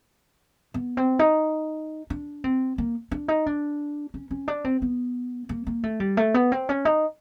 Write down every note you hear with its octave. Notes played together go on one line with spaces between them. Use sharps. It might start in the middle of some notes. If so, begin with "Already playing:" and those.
B3
C4
D#4
D4
C4
A#3
D4
D#4
D4
C#4
C#4
D4
C4
B3
A#3
A#3
A3
G3
A3
B3
C4
C#4
D#4